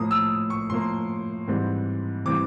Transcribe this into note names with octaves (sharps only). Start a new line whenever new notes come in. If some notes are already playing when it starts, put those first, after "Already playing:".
Already playing: A2 F3 A#3 D#6
E6
C#6
A2 F3 A#3 C6
G#2 E3 G3 C4
E3 G3 C4 D6